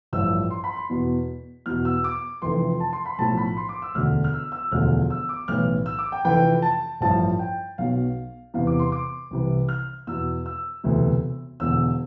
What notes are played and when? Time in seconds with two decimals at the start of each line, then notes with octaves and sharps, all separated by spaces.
0.13 A1 G2 F3 E6
0.50 C6
0.64 B5
0.76 C6
0.89 E2 B2
1.66 E2 B2 F6
1.85 E6
2.04 D6
2.42 F1 F2 E3 C6
2.80 A5
2.93 C6
3.06 B5
3.18 B1 A2 F3 A5
3.37 B5
3.57 C6
3.69 D6
3.82 E6
3.95 E1 D2 D3 F6
4.24 F6
4.33 E6
4.52 E6
4.72 E1 D2 D3 F3 F6
5.10 E6
5.29 D6
5.48 B1 A2 E3 F6
5.86 E6
5.99 D6
6.12 G5
6.25 F1 F2 E3 G5
6.62 A5
7.01 A1 G2 F3 A5
7.39 G5
7.78 B1 B2 F5
8.54 E2 C3 E3 F5
8.67 D6
8.79 C6
8.92 D6
9.31 C2 C3 E3
9.69 F6
10.07 E2 B2 E6
10.46 E6
10.84 E1 D2 C3 E3
11.60 E1 E2 D3 E6